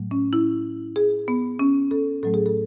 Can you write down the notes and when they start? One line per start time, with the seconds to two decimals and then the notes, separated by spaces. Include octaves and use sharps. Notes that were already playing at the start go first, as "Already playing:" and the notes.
Already playing: A2 F#3 A3
0.11 C#4
0.33 E4
0.96 G#4
1.28 B3
1.59 C#4
1.91 A4
2.23 A2 F#3 A3 A4
2.34 G#4
2.46 A4